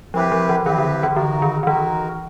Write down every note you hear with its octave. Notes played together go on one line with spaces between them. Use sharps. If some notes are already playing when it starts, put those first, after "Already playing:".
F3 C4 E4 G4 B4
F3
E3
D#3 C4 E4 G4 B4
D3
E3
D3 D#4 F#4 A#4
D#3
D#3
E3 D#4 F#4 A#4